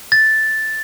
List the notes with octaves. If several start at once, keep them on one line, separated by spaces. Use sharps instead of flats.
A6